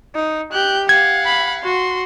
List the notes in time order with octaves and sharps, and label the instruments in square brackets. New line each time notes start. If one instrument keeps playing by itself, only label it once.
[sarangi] D#4
[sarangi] G4 [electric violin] F#6 G6
[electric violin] F5 F#5 [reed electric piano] G#6
[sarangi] B5
[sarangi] F#4 [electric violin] C6